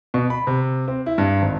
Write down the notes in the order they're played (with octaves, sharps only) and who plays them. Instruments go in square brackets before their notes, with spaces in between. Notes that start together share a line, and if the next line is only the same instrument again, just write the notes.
[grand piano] B2
B5
C3
C4
E4
G2
G#1